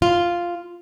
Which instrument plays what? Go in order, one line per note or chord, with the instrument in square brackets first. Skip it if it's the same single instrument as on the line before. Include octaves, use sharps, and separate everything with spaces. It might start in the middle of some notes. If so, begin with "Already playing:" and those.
[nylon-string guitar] F4